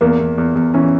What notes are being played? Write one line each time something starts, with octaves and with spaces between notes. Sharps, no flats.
E2 A#3
E2
E2
E2
E3 C#4